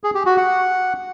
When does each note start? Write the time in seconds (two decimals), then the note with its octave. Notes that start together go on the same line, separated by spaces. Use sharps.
0.04 G#4
0.15 G4
0.26 F#4
0.37 F#5